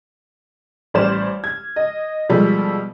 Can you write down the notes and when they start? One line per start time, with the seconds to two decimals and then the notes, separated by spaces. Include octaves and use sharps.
0.94 A1 G3 C5 D5 F6 E7
1.44 G#6
1.76 D#5
2.29 B2 F3 G3 G#3 A4